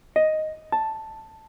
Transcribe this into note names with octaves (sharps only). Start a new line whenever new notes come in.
D#5
A5